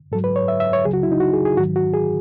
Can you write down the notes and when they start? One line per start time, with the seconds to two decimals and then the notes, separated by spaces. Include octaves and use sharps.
0.12 G#2 F#3 A4
0.24 B4
0.36 C#5
0.48 E5
0.60 E5
0.73 C#5
0.84 C#2 C#3 F#3 G#4
0.93 F#4
1.03 E4
1.12 D#4
1.20 F#4
1.33 G#4
1.45 G#4
1.57 G#2 D#3 F#3 F#4
1.76 F#4
1.93 G#4